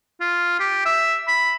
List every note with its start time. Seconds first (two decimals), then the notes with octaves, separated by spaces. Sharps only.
0.21 F4
0.60 G4
0.85 E5
1.28 B5